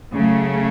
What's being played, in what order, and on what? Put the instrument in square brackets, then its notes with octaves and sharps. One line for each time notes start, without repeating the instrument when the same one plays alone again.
[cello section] C#3 F#3 A3